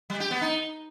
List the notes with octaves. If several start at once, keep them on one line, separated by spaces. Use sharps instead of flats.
G3
G4
B3
D#4